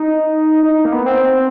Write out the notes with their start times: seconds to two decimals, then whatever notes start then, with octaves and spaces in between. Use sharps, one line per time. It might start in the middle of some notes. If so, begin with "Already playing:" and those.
Already playing: D#4
0.63 D#4
0.85 A#3
0.92 B3
1.06 C4